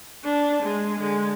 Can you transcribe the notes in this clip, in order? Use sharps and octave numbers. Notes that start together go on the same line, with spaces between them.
D4
G#3
D3 G#3